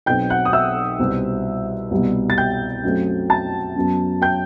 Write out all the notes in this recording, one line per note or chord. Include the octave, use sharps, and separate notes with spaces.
B1 B2 F#3 C4 G5 G6
F#5 F#6
D#6
E5 E6
C2 B2 G3 C4
C2 B2 G3 B3
A6
G5 G6
F#2 F#3 A3 C4
A5 A6
F#2 F#3 B3
G5 G6